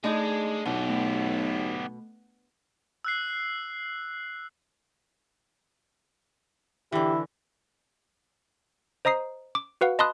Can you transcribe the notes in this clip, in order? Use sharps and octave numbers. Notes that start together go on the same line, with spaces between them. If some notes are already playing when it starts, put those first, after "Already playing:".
G#3 A3 D4 D#4 G#4 D#5
B1 B2 B3 G4
A3
E6 F#6 C7
D3 E3 E4 G4
C5 D#5 A#5 D#6 C7
D6
F#4 B4 F5 F#5
D#5 A5 B5 C6 D#6 F#6